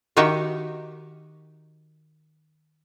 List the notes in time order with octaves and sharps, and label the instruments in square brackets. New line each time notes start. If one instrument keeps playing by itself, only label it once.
[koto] D#3 D#4 F#4 G4 E5